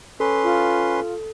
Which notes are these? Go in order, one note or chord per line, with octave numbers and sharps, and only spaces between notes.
C#4 A4 B4 C6
F4